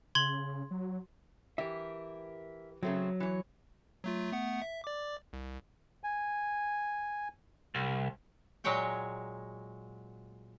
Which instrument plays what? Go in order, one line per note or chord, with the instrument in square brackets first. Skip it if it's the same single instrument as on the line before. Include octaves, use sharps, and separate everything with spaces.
[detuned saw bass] C#3 [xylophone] C6 G#6 F#7
[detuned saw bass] F#3
[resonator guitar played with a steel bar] E3 G4 [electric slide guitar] A#4 E5
[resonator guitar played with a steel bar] C#3 A3 C4 [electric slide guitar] F#3
[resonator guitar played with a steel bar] E3 C#5
[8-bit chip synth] F#3 A3 F4
A3 B3 F#5
E5
D5 D6
C2
[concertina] G#5
[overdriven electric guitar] C2
[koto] A#2 F#3 G#3 C#5 G5 G#5